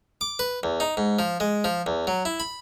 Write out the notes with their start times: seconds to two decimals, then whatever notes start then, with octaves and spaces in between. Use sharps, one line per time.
0.21 D6
0.39 B4
0.63 E2
0.80 D#4
0.97 G#2
1.19 F3
1.40 G#3
1.64 F3
1.86 E2
2.07 F#3
2.25 E4
2.40 B5